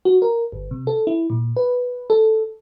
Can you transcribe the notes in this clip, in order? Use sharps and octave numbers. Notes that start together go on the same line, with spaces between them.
F#4
A#4
G1
C3
A4
E4
A#2
B4
A4